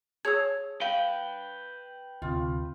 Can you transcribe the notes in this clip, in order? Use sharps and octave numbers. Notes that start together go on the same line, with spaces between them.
G#4 C#5 A5 E6 G#6
B4 F5 G5
D2 C3 F4